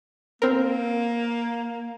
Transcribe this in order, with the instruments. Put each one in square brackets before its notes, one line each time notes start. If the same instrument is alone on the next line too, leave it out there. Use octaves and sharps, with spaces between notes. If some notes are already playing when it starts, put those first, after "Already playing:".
[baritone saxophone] A#3 [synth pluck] C4 A#4